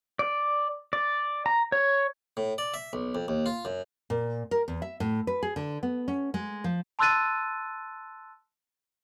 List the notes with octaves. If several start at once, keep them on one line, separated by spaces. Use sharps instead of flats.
D5
D5
A#5
C#5
A2
D5
E5
B1
F2
D#2
F4
F#2
A#2
A#4
E2
E5
A2
B4
G#4
D3
B3
C#4
G#3
F3
A5 C6 E6 F#6 A6 D#7